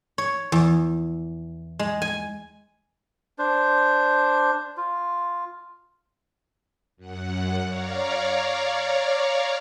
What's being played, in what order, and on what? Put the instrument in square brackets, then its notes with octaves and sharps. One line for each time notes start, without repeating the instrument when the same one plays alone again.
[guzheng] C#5
E2
G#3
G#5
[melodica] D4 C5
F4
[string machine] F#2 F#5
C#5 D5 F5 A#5